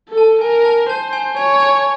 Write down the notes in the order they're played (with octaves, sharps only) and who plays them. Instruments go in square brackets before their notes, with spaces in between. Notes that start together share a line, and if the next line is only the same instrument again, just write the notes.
[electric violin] A4
[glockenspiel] A5
[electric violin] A#4 [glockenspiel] G#5
[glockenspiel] A5
[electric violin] C5 [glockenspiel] A5
[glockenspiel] G#5
[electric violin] C#5 [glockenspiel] G#5
[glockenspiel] G#5